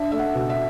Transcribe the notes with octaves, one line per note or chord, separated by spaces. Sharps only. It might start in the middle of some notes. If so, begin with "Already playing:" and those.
Already playing: D4 E5
A3 E5
F#5
B2
E5